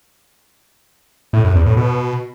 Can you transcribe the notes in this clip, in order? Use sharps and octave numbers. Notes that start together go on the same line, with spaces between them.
A2
F#2
E2
A2
B2